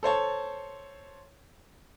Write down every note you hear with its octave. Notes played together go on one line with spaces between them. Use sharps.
A4 C5 C#5 A5